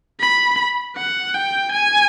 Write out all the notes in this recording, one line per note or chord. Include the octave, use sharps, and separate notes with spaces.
B5
F#5
G5
G#5